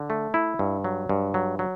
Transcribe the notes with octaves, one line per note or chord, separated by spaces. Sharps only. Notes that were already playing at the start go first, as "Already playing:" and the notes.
Already playing: D3
A3
E4
G2
F#3
G2
F#3
F#3